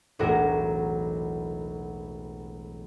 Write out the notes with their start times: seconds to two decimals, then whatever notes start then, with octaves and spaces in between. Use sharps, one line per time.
0.19 E1 B1 A2 F#4 A#4